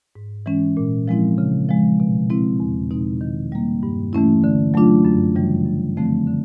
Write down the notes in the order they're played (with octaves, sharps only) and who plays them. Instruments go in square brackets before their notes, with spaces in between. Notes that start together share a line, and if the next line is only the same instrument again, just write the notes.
[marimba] G#2
E3 G#3 C#4
A#2
F3 G#3 C4 E4
C#3
F3 G#3
B2
G#3 C4 E4
E2
B2 G#3 C4 D#4
D#3
G3 A#3
G2
E3 A3 C#4 E4
D3
F#3 A3 D4 F4
F#2
C#3 E3 G3
F#2
D3 F3 A3 C4
D3